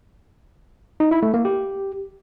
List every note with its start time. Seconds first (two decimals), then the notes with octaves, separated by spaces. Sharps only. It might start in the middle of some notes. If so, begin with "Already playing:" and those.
1.00 D#4
1.11 E4
1.23 A3
1.34 A#3
1.45 G4